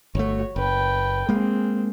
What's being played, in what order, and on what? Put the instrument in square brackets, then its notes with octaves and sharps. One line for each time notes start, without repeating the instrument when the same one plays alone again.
[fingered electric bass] G1 A3 [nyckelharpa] F#4 C#5
[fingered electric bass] F#1 [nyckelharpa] B4 G5
[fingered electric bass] G#3 A#3 [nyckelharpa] C4 G#4